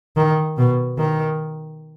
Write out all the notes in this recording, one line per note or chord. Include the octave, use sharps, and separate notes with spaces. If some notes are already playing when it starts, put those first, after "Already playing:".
D#3
B2
D#3